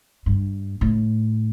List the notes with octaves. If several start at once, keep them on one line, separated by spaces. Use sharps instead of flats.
G2
A2